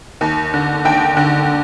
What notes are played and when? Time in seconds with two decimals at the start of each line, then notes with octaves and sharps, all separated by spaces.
0.21 D#2
0.54 D3
0.85 D#2 G5
1.17 D3